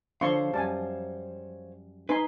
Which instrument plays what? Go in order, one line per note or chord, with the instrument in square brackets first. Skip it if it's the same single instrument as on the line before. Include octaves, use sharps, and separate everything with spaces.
[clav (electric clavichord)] D3 [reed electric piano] F3 [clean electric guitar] C5 C#5 F5 [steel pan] C6 C#6
[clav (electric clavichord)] F#2 G3 [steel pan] G#5 A5
[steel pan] D#4 G#5 C6 [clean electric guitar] B4